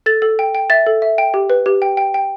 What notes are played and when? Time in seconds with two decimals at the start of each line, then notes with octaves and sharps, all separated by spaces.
0.06 A4 A6
0.22 A4
0.39 G5
0.55 G5
0.70 E5 A6
0.87 A4
1.02 E5
1.18 G5
1.34 G4
1.50 B4
1.66 G4
1.82 G5
1.97 G5
2.14 G5